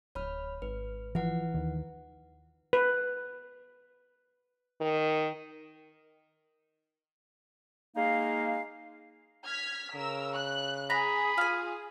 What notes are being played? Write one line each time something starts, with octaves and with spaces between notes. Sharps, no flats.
D1 C#5 B5 F6
G#1 B4
E3 F3 E4 B4 F#5
D#2 D#3
B4
D#3
G#3 A#3 D#4 F5
F6 G#6 B6
C#3 A#4 E6
F#6
G#4 A#5 B5
F4 F5 G#5